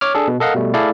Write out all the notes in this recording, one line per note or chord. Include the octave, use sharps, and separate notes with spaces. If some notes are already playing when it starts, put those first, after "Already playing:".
C#5 D6 F6
D4 G#4 A4
B2
A4 A#4 D#5 F5 F#5
B2 G3 A3
A3 E4 G#4 A4 D5 F5